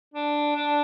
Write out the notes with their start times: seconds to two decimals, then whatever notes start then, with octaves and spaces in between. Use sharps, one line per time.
0.14 D4
0.56 D4